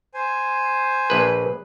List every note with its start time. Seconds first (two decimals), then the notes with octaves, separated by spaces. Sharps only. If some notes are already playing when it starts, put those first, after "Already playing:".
0.14 C5 G#5
1.10 A#1 B4